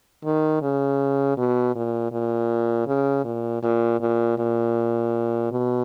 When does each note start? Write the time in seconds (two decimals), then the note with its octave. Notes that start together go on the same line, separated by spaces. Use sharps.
0.25 D#3
0.62 C#3
1.38 B2
1.75 A#2
2.12 A#2
2.87 C#3
3.25 A#2
3.63 A#2
4.01 A#2
4.38 A#2
5.52 B2